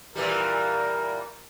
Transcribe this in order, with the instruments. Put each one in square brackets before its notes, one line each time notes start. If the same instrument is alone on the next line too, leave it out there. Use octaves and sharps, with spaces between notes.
[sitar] A#2 E3 G3 [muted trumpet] A#4